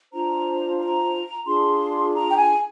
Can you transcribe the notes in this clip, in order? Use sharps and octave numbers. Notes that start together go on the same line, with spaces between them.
D4 F4 C5 A#5
A#5
D4 F4 G#4 C6
A#5
G5
G#5